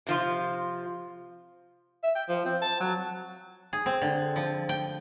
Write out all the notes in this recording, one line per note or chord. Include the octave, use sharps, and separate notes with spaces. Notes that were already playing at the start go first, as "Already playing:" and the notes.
C3 F3 F4
E5
G5
F3
C4
A5
F#3
G#4
C4
D3
F3
G5